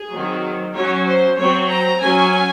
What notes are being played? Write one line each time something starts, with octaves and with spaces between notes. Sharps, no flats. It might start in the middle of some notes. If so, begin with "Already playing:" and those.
Already playing: G#4
D#3 F#3 C4
F#3 C#4 C#5
C5
F#3 C4 C#5
A#5
F#3 C#4 G#5